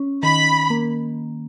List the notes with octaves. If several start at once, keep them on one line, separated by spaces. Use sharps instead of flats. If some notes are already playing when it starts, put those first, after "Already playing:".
Already playing: C#4
D#3 B5
A#3